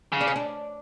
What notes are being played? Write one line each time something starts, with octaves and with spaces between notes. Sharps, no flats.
C#3
D4
C#4
D4